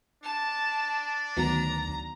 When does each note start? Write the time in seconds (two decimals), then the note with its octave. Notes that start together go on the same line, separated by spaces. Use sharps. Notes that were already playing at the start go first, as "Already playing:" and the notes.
0.23 D4 A5
1.37 D2 D#3 F#3 B3 A#5